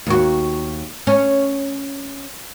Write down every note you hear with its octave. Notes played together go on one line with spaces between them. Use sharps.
D#2 F#4
C#4